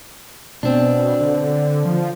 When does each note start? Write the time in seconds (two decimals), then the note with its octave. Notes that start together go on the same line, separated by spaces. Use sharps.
0.63 B2 C4 D4
1.21 D3
1.85 F3